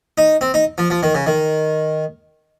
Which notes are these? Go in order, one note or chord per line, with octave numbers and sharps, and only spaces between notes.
D#4
C4
D#4
F3
F3
D#3
C#3
D#3